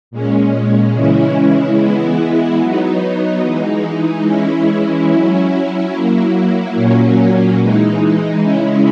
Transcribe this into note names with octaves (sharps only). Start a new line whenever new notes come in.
A#2 G#3 C#4
C#3 E3 G#3 C#4 E4
E3 G#3 B3 E4
F#3 B3 D#4
E3 G#3 D#4
E3 G#3 C#4 E4
F#3 C#4 E4
F#3 A#3 E4
A#2 F#3 A#3 C#4
E3 G#3 D#4
C#3 G#3 C#4 E4